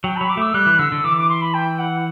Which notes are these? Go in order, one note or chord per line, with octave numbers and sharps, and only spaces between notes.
F#3 G5
F#3 B5
D6
A3 E6
G3 F#6
E3
D3 E6
D3
E3 D6
D6
C6
B5
G5
F#5